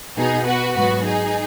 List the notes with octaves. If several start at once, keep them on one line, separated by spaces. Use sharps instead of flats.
B2 B3 D#4 G#4
F#4 B4
G#2 F#3 B3 F#4 B4
D#4 G#4